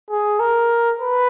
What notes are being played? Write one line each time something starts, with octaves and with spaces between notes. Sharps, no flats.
G#4
A#4
B4